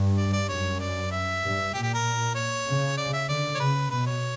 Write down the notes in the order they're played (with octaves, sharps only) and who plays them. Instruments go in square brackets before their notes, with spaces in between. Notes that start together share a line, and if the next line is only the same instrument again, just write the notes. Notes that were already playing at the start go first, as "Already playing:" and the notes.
Already playing: [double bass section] G2
[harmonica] D5
D5
[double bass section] F#2 [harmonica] C#5
[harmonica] D5
E5
[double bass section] G2
[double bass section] A#2 [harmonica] G4
[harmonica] G4
A#4
C#5
[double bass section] C#3
[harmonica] D5
E5
[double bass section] D3 [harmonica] D5
[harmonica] C#5
[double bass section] C#3 [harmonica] B4
[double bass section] B2 [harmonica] B4
[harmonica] C#5